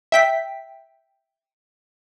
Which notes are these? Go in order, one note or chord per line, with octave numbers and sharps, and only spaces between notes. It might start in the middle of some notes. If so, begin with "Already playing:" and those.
E5 G5 B6